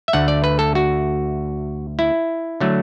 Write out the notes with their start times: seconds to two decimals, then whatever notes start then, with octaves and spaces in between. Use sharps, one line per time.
0.08 E5
0.13 D2 D3 A3 F#5
0.28 D5
0.44 B4
0.59 A4
0.75 F#4
1.99 E4
2.60 D3 F#3 A3